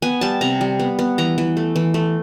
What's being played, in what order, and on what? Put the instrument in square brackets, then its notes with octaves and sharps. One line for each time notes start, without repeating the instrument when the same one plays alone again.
[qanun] B3 G#5
G3 A5
C3 A#5
G3
B3
B3
E3 A#5
E3
A3
E3
A3